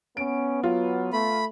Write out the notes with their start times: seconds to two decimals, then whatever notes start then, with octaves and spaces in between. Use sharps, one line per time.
0.17 B3 C#4 D7
0.63 F#3 F4
1.13 A3 B5